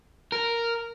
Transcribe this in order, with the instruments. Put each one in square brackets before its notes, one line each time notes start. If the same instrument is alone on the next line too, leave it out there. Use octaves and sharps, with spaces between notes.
[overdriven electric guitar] A#4